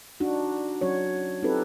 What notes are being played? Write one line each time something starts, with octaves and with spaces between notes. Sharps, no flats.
D4 D#4 F#4
F#3 C#4 F#4 C#5
C4 D#4 F4 G4 A4 B4